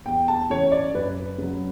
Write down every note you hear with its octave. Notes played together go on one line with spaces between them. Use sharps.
E2 G5
A5
C#3 E3 C#5
D5
F#2 B4
C#3 F#3